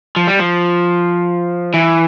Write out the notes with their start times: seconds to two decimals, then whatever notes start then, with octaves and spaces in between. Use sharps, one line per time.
0.16 F3
0.27 G3
0.39 F3
1.74 E3